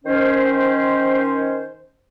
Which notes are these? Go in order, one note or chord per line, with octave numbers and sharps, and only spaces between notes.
D#3 C#4 C5